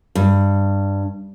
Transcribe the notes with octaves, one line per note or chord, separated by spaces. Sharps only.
G2